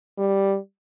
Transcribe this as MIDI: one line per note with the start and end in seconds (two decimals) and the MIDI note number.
0.18 0.57 55